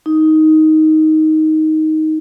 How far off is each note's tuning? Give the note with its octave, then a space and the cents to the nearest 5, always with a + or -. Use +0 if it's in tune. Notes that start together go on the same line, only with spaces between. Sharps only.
D#4 +10